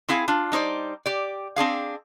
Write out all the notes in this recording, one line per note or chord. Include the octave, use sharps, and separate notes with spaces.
C4 E4 G#4 F5 G#5
D4 F4
G3 D#4 C5 D5
G4 D5
C4 D4 G#4 F5